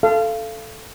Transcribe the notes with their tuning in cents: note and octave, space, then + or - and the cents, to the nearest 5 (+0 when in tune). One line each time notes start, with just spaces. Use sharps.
A4 +0 F5 -25